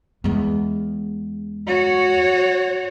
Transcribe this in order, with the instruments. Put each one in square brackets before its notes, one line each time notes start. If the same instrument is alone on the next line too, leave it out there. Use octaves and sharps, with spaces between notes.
[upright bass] E2 G#3
[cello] F#4 C#5